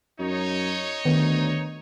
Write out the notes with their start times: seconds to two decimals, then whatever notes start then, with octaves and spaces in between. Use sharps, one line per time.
0.19 F#2 D#4 C#5
1.05 D2 D#3 B3